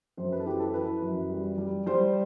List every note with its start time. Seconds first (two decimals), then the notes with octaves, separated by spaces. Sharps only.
0.17 F#2 C5
0.32 B4
0.40 A4
0.46 E3 G4
0.60 A4
0.74 E3 B4
1.02 F#2
1.30 G3
1.58 G3
1.86 G3 C5